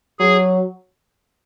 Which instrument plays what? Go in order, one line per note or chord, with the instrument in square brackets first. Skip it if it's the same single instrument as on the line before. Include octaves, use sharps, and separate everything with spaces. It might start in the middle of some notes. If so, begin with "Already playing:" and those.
[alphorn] F#3 [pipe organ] G#4